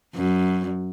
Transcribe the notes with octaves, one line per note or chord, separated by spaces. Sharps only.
F#2